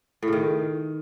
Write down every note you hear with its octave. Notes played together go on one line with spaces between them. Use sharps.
A2
C#3
D#3